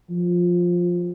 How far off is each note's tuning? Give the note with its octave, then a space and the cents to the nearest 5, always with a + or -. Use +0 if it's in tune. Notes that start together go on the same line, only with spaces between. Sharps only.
F3 +10